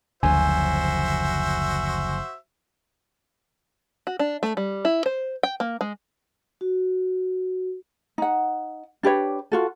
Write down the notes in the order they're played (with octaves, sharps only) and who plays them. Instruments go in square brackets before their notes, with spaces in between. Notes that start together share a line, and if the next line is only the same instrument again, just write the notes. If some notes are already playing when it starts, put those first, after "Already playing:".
[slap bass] F#1 D3 F3 [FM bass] D2 [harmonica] F#4 C5 E5 [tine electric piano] G#5
[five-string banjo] F#4
D4
A3
G3
E4
C5
G5
A#3
G#3
[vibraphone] F#4
[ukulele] D#4 F#5
D4 G4 B4 C#5
F4 F#4 A4